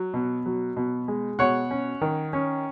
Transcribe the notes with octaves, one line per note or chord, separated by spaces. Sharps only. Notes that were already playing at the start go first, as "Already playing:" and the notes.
Already playing: F#3
B2
F#3
B2
G#3
B2 C#5 F#5
C#4
D#3
C#4